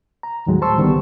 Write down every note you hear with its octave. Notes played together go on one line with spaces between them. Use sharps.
A#5
D#2 A2 D#3 F#3 G#3
C5 A5 C6 C#6 E6
C2 D3 D#3 G3 B3